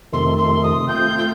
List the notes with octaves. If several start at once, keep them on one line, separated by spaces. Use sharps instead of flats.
F2 C3 D#3 A3 C6
C6
D#6
A3 C4 F4 G6
G6